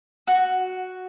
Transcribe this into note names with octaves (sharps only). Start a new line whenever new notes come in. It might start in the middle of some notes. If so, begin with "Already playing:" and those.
F#4